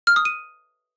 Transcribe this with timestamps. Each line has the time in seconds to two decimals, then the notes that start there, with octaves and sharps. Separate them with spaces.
0.07 F6
0.16 D#6
0.25 D#7